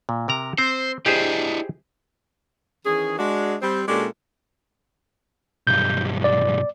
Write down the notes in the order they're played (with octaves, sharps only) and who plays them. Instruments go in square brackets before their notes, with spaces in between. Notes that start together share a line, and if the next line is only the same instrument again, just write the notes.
[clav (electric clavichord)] A#2
C3 A#4 A#5
[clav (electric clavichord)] C4 [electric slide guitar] C5
[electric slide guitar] E4 D5 D#5 [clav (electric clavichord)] G4 G#4 C5
[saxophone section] D#3 E3 C#4 G#4
G#3 D4 F#4
G3 C4 C5
A#2 G#3 C#4 D4 G4 A4
[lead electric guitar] B1 G2 [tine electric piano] G6
[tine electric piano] D5